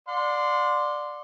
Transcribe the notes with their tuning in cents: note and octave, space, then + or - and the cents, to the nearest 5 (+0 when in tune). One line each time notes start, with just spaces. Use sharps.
D5 +10 F#5 -45 C6 -10